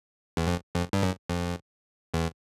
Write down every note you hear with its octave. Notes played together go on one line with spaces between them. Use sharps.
E2
F2
F2
G2
F#2
F2
E2